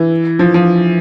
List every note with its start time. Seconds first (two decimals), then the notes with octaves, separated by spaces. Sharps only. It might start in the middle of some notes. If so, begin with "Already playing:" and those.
Already playing: E3
0.39 F3
0.54 F3